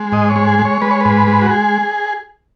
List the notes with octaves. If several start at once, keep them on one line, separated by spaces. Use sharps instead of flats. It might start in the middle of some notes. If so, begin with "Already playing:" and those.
Already playing: G#3
G#2 D#5
C#5
G#3
G#4
G#3
C#5
G#3 B4
C#5
G#2 B4
G#3
F#4
G#4